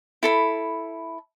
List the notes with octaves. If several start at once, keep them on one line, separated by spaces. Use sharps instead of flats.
E4 A4 B5